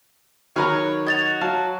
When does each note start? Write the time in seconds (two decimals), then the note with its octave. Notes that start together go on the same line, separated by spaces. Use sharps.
0.56 D#3 F#3 G#4 B4 C#5 A#5 F6
1.07 F#4 D#5 G#6 A6 F7
1.41 F#3 F5 A5